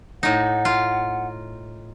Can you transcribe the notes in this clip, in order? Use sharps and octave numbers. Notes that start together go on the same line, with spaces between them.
A2 D#4 F#5
F4